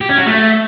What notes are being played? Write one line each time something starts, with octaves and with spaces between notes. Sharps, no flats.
G4
C#4
F#4
A3